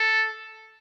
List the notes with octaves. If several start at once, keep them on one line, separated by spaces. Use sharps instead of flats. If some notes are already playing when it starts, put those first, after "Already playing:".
Already playing: A4